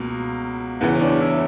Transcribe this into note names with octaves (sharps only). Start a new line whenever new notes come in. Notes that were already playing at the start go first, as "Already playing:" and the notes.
Already playing: C#2 B2 A#3
E2 C#3 E3 B3
C#4
D4
E4